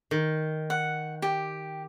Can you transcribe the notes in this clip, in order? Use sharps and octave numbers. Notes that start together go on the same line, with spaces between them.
D#3
F#5
G4